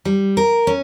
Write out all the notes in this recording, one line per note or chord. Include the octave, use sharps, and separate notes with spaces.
G3
A#4
C#4